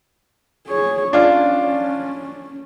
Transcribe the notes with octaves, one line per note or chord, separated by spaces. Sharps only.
G#4 C#5
C#4 D4 F4